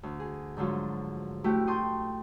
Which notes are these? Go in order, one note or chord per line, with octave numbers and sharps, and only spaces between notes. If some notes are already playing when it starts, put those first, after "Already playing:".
D2
G#4
G#2 D3 F3 F#3 F4
A2 A3 C4 E4 F#4 G4
G5 A5 C6 C#6 D#6